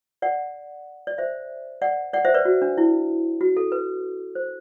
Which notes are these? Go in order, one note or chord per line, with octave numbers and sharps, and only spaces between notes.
D5 F#5
D5
C5 E5
D5 F#5
D5 F#5
C5 E5
B4 D5
F#4
D4
E4
F#4
A4
B4
C5